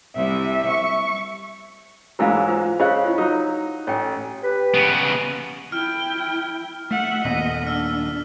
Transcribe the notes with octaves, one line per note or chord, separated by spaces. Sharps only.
C2 E5
C#6
G#2 E3 F#3 A#4 F5
F4 C5
C#3 C#4 C5 D#5 F5 F#6
E4 F4
F#3 D#4
A1 C#5 G5 G#5
G4 B4
C#3 B3
E4 G5 F6
A3 E5 F#5
D#2 A#2 B3 D#5 B6
D4 E6 F6